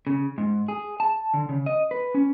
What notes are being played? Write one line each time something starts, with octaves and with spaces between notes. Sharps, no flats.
C#3
G#2
G#4
A5
D3
C#3
D#5
B4
C#4